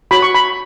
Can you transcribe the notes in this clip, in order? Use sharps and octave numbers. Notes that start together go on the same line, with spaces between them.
F#4 C#5 B5
C#6
B5